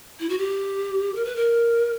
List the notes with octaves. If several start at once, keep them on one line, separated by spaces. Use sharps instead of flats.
E4
F#4
G4
A#4
B4
A#4